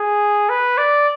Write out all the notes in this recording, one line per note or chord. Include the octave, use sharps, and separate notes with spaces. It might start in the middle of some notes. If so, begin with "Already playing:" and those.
Already playing: G#4
B4
D5